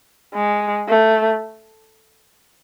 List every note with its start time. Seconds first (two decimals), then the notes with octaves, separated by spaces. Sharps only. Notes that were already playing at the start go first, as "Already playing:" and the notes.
0.34 G#3
0.88 A3